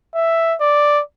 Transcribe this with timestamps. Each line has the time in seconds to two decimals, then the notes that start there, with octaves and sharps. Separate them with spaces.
0.15 E5
0.61 D5